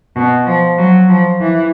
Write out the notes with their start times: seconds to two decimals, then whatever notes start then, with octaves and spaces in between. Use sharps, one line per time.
0.16 B2
0.46 F3
0.78 F#3
1.08 F3
1.40 E3